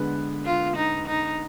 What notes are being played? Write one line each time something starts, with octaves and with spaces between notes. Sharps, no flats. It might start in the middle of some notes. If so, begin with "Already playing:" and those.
Already playing: D3 G#3 B3 B4
F4
D#4
D#4